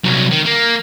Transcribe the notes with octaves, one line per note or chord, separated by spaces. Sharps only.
C2 F#3
D#3
A#3